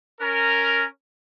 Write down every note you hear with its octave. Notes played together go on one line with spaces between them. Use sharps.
C#4 A#4